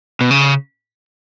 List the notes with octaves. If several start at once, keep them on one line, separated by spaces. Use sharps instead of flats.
B2
C#3